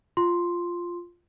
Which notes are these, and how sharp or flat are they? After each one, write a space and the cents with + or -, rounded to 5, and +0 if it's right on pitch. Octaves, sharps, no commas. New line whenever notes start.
F4 +0 C6 +0